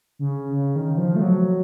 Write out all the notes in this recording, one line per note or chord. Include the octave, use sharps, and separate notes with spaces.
C#3
C#3
D#3
F3
A3
F#3